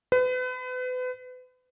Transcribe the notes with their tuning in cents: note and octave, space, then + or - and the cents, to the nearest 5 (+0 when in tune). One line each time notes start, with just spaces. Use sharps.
B4 +35